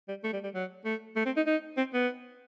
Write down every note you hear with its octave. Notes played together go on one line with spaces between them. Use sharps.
G3
A3
G3
G3
F#3
A3
A3
C4
D#4
D#4
C4
B3